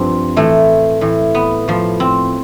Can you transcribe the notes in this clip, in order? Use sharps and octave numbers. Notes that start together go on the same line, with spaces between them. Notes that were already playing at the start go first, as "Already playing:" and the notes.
Already playing: G2 F3 C4
A2 E3 A3
A2 E3
B3
A2 F3
C4